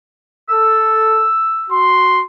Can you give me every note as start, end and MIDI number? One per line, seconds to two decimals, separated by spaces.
0.49 1.26 69
0.49 1.83 88
1.70 2.21 66
1.70 2.21 84